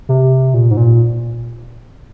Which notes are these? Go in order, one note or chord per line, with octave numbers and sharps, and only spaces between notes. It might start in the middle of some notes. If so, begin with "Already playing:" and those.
C3
A#2
G#2
A#2